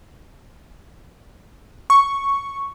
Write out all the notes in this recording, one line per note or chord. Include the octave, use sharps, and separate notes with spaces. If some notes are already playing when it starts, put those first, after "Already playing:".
C#6